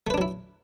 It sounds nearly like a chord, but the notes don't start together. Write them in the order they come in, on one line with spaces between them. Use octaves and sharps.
A3 B4 D4 F#3 E4